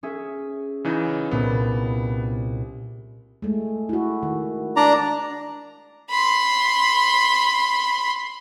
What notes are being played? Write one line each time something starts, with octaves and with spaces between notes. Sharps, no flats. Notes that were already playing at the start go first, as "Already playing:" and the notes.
C#4 G#4 E5
C#3 E3 D#4
C2 A#2 B3
G#3 A3
E4 F#4
D#3
D4 D5 A#5
B5 C6